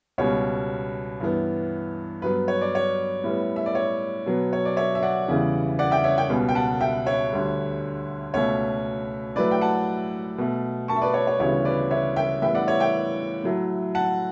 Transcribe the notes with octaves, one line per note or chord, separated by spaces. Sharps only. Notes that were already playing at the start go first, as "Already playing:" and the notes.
C#2 B2 G3 C#5
G2 E3 B3
G2 F#3 B3 B4
C#5
D5
C#5
A2 G3 B3
E5
D5
C#5
B2 F#3 B3
C#5
D5
C#5 E5
E5
D5 F#5
E2 C#3 E3 G3
D5 F#5
E5 G5
C#5 E5
E5 G5
C#2 B2 G3 B3
G5
F#5 A5
E5 G5
C#5 E5
D2 D3 G3
C#2 B2 A3 C#5
A2 F#3 A3 B4 D5
G5
F#5 A5
B2 A3
A5 C#6
E5
B4 D5
C#5
C#5
D2 C#3 E3 G3 B3 C#5
B4 D5
C#5 E5
E5 G5
A2 E3 G3 B3 E5 G5
D5 F#5
C#5 E5
E5 G5
A2 F#3 A3
F#5 A5